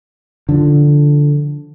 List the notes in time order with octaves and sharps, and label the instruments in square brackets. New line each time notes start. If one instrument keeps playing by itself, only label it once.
[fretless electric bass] D3 F3